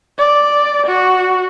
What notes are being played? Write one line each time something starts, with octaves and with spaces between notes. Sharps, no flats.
D5
F#4